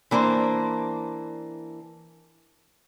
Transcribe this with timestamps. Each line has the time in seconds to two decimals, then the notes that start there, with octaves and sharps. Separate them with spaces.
0.11 E3 A#3 D4 C5